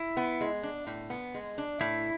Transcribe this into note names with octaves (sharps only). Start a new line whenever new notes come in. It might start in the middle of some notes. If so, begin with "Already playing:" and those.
Already playing: E4
B3
G#3
D4
A2
B3
G#3
D4
A2 E4